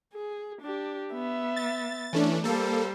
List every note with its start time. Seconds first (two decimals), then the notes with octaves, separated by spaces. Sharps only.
0.13 G#4
0.61 D4 G4
1.12 B3 E5
1.56 A6
2.13 E3 A3 C#4 D4
2.44 G3 A#3 A4 C5